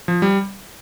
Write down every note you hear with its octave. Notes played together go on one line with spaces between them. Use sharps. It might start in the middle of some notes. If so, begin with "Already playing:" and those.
F3
G3